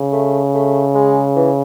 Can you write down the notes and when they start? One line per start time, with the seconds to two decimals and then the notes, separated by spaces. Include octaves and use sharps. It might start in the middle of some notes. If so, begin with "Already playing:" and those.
Already playing: C#3
0.13 A3
0.54 A3
0.95 G#3
1.36 E3